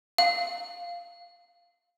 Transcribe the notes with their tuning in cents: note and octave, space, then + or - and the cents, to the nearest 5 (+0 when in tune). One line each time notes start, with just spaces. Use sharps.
F5 -5